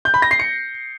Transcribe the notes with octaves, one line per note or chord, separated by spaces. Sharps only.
G6
B5
A#6
C7
C#7